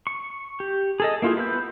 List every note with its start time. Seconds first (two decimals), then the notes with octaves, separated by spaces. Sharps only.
0.07 C#6
0.60 G4
1.00 G#4 A4 D#5
1.22 A#3 E4 F4 G4 G#4
1.37 B3 B4 E6 G6